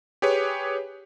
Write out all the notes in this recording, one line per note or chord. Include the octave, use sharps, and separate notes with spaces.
G4 G#4 B4 C#5